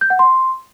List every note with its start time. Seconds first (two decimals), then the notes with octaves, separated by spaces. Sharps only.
0.01 G6
0.10 F#5
0.19 C6